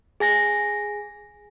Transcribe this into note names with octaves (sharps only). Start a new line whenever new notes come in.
G#4 G#5 A#6